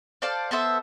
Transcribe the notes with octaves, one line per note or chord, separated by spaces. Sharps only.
A4 C5 D5 F5
B3 A4 C5 E5